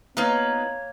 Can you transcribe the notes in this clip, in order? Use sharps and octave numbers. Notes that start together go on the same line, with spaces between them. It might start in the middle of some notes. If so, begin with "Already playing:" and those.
A#3 B3 D#4 F4 B4 C#5